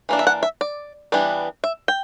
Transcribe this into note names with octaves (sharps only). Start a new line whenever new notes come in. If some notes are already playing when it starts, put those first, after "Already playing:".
E3 A#3 D4
E5
F#5
E5
D5
E3 G3 B3 D4
E5
G5